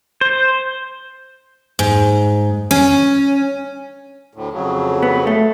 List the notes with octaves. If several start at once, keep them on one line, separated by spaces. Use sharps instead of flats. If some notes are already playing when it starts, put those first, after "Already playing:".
C5
G#2
C#4
D2 A2
F2 C#3 F#3
B3
A3